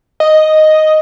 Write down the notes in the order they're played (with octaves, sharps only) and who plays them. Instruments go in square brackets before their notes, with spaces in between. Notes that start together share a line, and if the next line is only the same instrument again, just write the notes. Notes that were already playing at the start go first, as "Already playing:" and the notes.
[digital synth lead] D#5